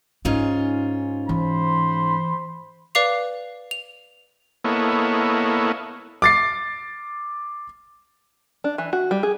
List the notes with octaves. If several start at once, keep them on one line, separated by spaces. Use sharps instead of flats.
G#2 C#4 D#4 F4
E3 C5 B5 C6
B4 D5 F5 D6 C7 F7
F7
A#3 B3 E4 A4 C#5 D#5
D6 A6 C7
D4
E3
F#4
G3
G#4